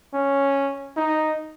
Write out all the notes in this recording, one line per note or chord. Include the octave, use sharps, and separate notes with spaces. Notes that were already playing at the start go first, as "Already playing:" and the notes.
C#4
D#4